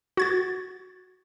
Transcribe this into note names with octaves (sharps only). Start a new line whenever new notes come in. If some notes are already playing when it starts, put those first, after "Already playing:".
F#4 G#6 A6